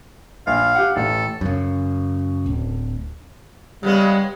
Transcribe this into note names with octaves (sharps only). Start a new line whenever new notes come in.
A#1 F5
G4 F#5
A1 A4
F#2 C#3
D1
C#3 G3 G#3 B3